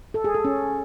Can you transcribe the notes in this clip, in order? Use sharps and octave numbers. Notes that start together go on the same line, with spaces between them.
A4
G#4
A4
C#4